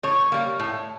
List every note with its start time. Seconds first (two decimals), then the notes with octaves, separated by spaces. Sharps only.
0.03 A2 C#5
0.32 G3 A#3
0.60 A2